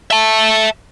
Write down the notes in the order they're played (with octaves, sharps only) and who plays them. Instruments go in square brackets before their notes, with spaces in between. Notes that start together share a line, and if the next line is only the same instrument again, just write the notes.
[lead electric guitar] E5 A5